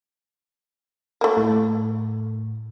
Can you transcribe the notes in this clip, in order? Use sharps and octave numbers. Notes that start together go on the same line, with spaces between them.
A3 A#3
A2